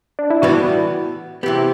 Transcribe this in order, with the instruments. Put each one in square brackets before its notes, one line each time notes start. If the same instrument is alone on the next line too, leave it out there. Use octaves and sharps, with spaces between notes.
[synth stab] D4
E4
[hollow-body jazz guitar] A2 E3 G3 B3 [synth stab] F#4
[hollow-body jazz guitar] C3 E3 B3 [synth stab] G4